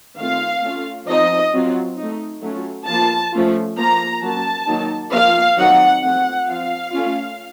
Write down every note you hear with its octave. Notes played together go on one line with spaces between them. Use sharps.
D#3 A3 C4 F4 F5
A3 C#4 F4
F3 C4 D#4 D#5
F#3 C4 F4
D#4
A3
F#3 A3 C#4 F4
F3 A#3 F4 A5
F3 A3 C#4 F4
F3 A#3 F4 A#5
F#3 A#3 C#4 A5
D#3 F#3 A#3 D#4
F3 A#3 F4 F5
D#3 F#3 C4 D#4 F#5
F3 A3 C4 F#5
F3 C4 F4 F5
A3 C#4 F4